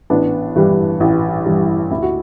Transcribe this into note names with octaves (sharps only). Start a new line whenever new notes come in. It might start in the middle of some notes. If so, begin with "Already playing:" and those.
A1 B3 D4
G2 E3 G3
A1
G2 E3 G3
D2 E4
F#4